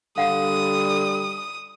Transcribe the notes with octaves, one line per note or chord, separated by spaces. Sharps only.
D3 G3 F5 F#5 D#6